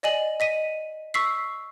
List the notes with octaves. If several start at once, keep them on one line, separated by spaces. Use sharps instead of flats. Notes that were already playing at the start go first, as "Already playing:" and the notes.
D5 D#5 G#5 F#7
D#5 B6 D#7
C#6 E6 B6 C7